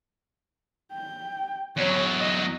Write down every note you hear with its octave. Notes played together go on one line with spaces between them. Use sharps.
G5
E2 F#3 C#5
D#5